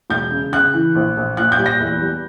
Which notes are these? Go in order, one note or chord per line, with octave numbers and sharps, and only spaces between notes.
E1 G6
C#3
C#3 F#6
E3
A#1
A#1
A#2 F#6
G6
G3
A#6
E2
G3